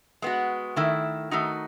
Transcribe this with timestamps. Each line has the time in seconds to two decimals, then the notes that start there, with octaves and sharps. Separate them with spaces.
0.22 G#3 B3 F#4
0.76 D#3 A3 E4
1.31 D#3 A3 D#4 F#4